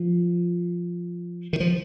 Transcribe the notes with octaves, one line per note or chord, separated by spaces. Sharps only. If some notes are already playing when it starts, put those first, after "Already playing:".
Already playing: F3
D#3
F3